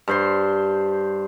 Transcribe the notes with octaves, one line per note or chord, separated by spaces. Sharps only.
G2 C5 C6